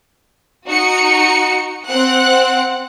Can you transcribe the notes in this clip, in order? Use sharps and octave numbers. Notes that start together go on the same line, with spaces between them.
D#4 F#4 C#7
C4 F#5 F#6